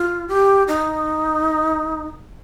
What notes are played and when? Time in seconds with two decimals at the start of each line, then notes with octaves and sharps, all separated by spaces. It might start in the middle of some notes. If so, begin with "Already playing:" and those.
Already playing: F4
0.28 G4
0.68 D#4